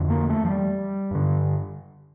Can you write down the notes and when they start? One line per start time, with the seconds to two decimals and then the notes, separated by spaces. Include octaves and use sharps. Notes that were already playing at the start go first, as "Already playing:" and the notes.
Already playing: F2 D3
0.10 A#3
0.30 A3
0.45 F3
0.50 G3
1.11 G2 D3